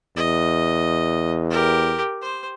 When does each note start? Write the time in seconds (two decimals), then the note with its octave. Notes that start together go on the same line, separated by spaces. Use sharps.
0.17 E2 D#5
1.50 G4 A#4
2.21 C5